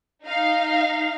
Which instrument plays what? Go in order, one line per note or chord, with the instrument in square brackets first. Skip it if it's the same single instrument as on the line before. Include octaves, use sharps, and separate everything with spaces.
[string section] D#4 F5